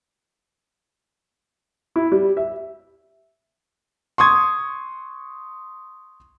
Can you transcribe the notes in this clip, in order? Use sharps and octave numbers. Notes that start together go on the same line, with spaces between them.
E4
G3
E5
C6 C#6 D#6 G#6